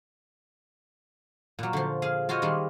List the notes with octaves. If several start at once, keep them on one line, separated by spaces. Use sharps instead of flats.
A#2 F#3
D3 F3
G#4 F5
F4 F#4 C5 C#5 D#5
D#3 G3 G#3 F4